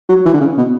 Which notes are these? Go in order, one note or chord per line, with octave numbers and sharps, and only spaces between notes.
F#3
E3
D3
C#3
B2